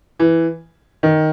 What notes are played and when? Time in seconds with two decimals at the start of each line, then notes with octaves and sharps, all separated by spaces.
0.20 E3
1.03 D#3